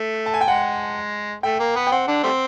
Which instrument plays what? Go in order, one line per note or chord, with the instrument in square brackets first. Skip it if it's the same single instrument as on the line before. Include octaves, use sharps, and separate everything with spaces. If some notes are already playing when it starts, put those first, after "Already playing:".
Already playing: [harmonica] A3
[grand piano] A5
G#5
G5
[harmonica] G#3 [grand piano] F#5
[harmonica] A3 [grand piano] G5
[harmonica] A#3
B3
[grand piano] G5
[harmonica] C4 [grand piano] F#5
[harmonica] D3 D4
G3 A3 C4